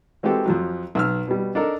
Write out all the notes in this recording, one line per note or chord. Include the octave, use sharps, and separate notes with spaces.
E3 G#3 C4 F#4 G4 A4
F2 F3 F#3
B1 E6 F6
B2 G3
D4 D#4 A4 A#4